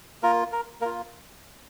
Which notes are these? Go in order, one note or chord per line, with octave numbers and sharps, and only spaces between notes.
A#3 F4 A#4
A#4
A#3 F4 A#4